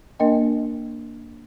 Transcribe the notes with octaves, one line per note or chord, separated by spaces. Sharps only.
A#3 D4 A#4 D#5 G5